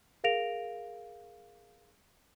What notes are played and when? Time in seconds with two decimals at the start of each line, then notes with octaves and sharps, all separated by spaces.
0.24 G#4 A#4 F5 A#6 D7 F7